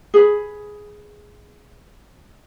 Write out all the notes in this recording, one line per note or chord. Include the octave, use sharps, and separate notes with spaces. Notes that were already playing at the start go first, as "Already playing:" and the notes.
G#4 B4